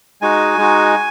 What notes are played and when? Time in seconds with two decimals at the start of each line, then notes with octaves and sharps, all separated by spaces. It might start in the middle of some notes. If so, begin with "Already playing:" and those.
0.21 G#3 D#4 F#4 G#5
0.58 G#3 D#4 F#4